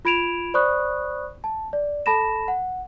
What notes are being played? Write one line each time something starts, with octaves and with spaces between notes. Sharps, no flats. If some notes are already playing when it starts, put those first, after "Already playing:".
F4 B5 G#6 D7 E7 F7
C5 D5 B5 C#6 D#6 F#6
A5
D5
A4 A5 B5 A#6 E7
F#5